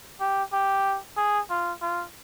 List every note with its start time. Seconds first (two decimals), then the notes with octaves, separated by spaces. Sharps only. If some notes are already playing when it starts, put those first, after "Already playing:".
0.20 G4
0.53 G4
1.17 G#4
1.50 F4
1.82 F4